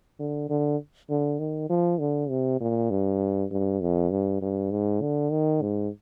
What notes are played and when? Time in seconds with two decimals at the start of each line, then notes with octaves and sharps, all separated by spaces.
0.19 D3
0.49 D3
1.10 D3
1.39 D#3
1.70 F3
2.00 D3
2.30 C3
2.60 A#2
2.91 G2
3.51 G2
3.81 F2
4.11 G2
4.42 G2
4.71 G#2
5.01 D3
5.31 D#3
5.62 G#2